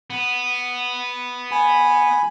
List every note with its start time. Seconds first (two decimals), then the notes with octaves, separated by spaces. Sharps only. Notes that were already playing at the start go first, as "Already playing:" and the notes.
0.10 B3
1.52 G#5 B5